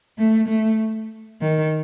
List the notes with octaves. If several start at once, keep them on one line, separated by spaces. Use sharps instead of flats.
A3
A3
D#3